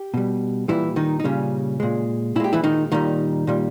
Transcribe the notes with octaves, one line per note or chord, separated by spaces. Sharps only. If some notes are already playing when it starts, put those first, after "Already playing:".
Already playing: G4
B2 G3
A#2 E3 G3 E4
D#3 D#4
D#4
A#2 C#3 G3 C#4
A#2 G#3
A#2 G#3 E4 G4
E3 E4
D#3 D#4
A#2 D#3 G3 D#4
A#2 G3